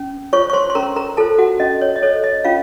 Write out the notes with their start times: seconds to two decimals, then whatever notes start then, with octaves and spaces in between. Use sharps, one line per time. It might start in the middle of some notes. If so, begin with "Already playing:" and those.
Already playing: C#4
0.33 F4 C5 C#5 C#6
0.50 C#6
0.53 C5 C6
0.70 C6
0.75 C#4 A#4 A#5
0.96 A#4 A#5
1.17 F4 A4 C5 A5
1.38 F#4 F#5
1.60 C#4 D#5
1.81 C#5
1.96 D#5
2.02 A4 C5 C#5
2.24 D#5
2.45 C#4 F4 F5